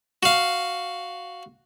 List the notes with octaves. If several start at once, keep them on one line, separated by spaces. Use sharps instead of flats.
F#4 F5